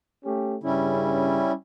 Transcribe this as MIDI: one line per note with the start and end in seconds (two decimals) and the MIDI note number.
0.24 0.56 57
0.24 0.56 61
0.24 0.56 67
0.63 1.47 43
0.63 1.47 49
0.63 1.52 55
0.63 1.52 61
0.63 1.52 64